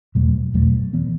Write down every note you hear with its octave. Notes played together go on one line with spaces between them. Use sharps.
E2 B2 F#3 A3
E2 B2 F#3 A3
E3 B3